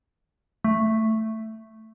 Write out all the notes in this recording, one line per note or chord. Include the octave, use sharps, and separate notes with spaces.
A3